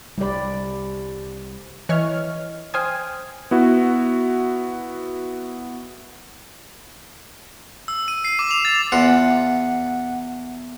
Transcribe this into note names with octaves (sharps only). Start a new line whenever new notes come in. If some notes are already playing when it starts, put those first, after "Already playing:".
C2 G3 G4 D5 B5
E3 C#5 D#5 F6
C5 G5 G#5 D#6 F6 G#6
B3 E4 F#4
E6
D#7
C7
D6
F7
A6
E2 F4 F#5